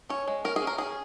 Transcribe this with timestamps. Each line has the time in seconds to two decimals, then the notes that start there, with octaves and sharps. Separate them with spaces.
0.09 C#4 C#5
0.28 G#3
0.45 C#4 A#4
0.56 G#4
0.62 C#4
0.67 A#4
0.78 C#4 G#4